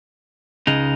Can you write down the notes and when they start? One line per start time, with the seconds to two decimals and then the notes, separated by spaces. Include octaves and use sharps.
0.67 C#2 C#3 G#3 D#4